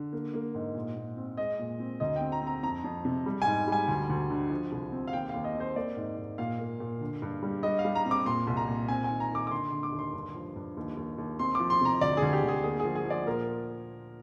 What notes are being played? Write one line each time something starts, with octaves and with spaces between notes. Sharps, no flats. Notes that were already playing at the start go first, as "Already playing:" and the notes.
Already playing: D3
A#3
A#3
G#2
A#2
A#2
C4
G#3 D#5
A#2
C4
D2 D#5
C4 G5
A#5
C4
A#5
F2 A#5
F2
C3
G3
G#2 G#5
G3 G#5
D2
D2
D3
F3
C2
C4
F5
D#2 G5
D#2 F5
D#5
C4
C5
A#3 D5
G#2
G#2
A#2 F5
A#3
A#2
D3
G2
G3
G3 D#5
F5
G3
A#5
C4
D6
A#2 C6
C2
A#5
A#2
C4 G#5
G#5
D#3
A#5
D#3 D6
D6
D3 C6
C6
D3
D6
D#2
C6
G2
F3
G2
D#2
D#2
D#2
C4 C6
F3 D6
C6
C3 A#5
D2 D5
G#4
D2
G4
D2 G#4
A#3 G#4
F3 G#4
G#4
F3 D5
A#2 A#4